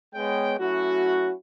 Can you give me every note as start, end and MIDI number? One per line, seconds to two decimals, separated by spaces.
0.15 0.54 56
0.15 0.54 59
0.15 0.54 73
0.15 0.54 79
0.58 1.32 54
0.58 1.32 57
0.58 1.32 61
0.58 1.32 64
0.58 1.32 66